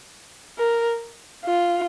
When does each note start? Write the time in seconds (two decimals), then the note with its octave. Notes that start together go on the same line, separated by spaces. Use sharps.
0.59 A#4
1.46 F4